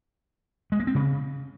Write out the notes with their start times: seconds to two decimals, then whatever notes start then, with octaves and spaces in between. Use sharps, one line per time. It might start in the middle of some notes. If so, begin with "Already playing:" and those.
0.72 G#3
0.80 A#3
0.87 C4
0.95 C#3